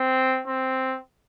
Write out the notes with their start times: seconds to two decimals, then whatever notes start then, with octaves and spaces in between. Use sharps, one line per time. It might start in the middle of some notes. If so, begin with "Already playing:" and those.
Already playing: C4
0.48 C4